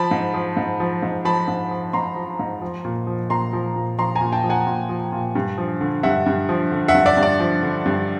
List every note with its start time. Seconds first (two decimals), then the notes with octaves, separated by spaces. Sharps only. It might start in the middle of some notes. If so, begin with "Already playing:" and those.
Already playing: F3 A5 B5
0.11 G#2
0.34 F3
0.57 G#2
0.80 F3
1.02 G#2
1.25 F3 A5 B5
1.48 G#2
1.71 F3
1.93 G#2 A#5 C6
2.16 F3
2.39 G#2
2.62 F3
2.85 A#2
3.07 F3
3.30 A#2 A#5 C6
3.53 F3
3.76 A#2
3.98 F3 A#5 C6
4.15 G#5 A#5
4.21 A#2
4.32 G5 A5
4.44 F3
4.49 F#5 G#5
4.67 A#2
4.89 F3
5.12 A#2
5.35 G2
5.58 F3
5.81 D3
6.03 G2 E5 F#5
6.26 G2
6.49 F3
6.72 D3
6.88 E5 F#5
6.94 G2
7.06 D5 E5
7.17 G2
7.23 D5
7.40 F3
7.63 D3
7.86 G2